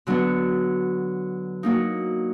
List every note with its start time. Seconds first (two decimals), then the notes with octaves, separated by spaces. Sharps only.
0.07 D3 F#3 B3
1.63 F#3 A#3 D#4